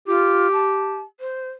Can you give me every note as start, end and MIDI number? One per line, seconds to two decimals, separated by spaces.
0.08 0.51 65
0.08 1.02 67
0.53 1.01 81
1.20 1.49 72